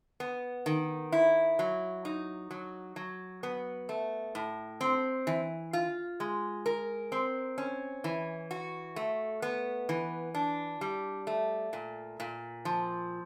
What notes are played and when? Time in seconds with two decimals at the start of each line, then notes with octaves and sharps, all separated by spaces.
0.20 B3
0.66 D#3
1.12 E4
1.59 F#3
2.05 D#4
2.51 F#3
2.96 F#3
3.43 B3
3.89 A3
4.35 A2
4.81 C4
5.27 E3
5.73 F4
6.20 G#3
6.66 A#4
7.12 C4
7.58 C#4
8.04 E3
8.51 F#4
8.96 A3
9.42 B3
9.89 E3
10.35 D4
10.81 G3
11.27 A3
11.73 A#2
12.20 A#2
12.65 F3